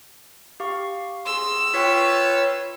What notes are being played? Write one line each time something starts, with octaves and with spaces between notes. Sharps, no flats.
G4 F5 C#6
G#4 C6 E6
F4 B4 C#5 G5 B6